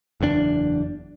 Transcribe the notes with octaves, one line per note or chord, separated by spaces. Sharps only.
F#1 E2 C#3 D4